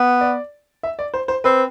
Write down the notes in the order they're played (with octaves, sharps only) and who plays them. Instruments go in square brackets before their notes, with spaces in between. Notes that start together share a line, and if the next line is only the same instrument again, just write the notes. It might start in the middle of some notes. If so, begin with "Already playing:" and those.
Already playing: [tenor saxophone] B3
[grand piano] D5
E5
D5
C5
C5
[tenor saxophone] C4 [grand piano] B4